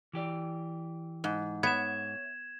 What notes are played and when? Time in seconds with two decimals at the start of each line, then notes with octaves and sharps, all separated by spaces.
0.13 E3 G4 D5
1.24 G#2
1.63 B3 C#5 E5 G#6 E7